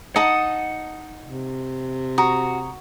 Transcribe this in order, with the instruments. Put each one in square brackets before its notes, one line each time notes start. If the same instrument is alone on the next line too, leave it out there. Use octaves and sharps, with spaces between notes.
[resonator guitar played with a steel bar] D#4 [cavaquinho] D#5 A5 D#6 [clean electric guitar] F#5
[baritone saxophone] C3
[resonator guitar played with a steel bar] F#4 [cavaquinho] A#5 D#6